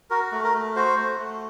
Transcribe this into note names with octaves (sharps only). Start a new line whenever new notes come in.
F#4 A#4
A3
A#4
A3
F#4 C5
A3
A3